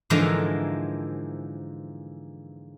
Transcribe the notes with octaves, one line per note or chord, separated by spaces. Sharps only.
G#2 D3 E3 F3 G#3 A#3